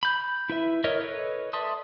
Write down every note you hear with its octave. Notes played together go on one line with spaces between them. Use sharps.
B5 G6
E4 B4 E5
A#4 C#5 D#5 E5
A4 B4 C#5 D#5
D5 E5 A5 C6 D#6